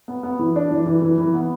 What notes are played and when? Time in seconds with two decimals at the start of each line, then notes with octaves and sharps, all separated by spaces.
0.08 B3
0.23 B3
0.39 E3
0.56 D4
0.71 E3
0.86 E3
1.02 E3
1.18 E3
1.34 B3